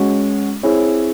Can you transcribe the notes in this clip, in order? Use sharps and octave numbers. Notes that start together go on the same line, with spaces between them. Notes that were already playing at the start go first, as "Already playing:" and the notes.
Already playing: G#3 C#4 F#4
C4 E4 G#4 C#5